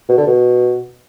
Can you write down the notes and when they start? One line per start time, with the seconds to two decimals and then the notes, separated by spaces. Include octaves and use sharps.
0.09 B2
0.18 D3
0.27 B2